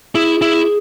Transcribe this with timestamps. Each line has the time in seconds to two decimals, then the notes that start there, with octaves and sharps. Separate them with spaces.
0.15 E4 G#4
0.42 E4